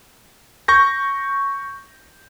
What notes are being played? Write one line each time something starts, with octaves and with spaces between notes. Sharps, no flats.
C#6 G6 A#6